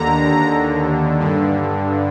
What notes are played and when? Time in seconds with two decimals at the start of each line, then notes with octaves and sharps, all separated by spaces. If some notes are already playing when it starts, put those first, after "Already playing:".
Already playing: D#2 D3 A#5
1.19 G2 D3